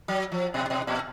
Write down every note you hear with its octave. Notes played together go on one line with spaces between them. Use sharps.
F#3
F3
B2
B2
A#2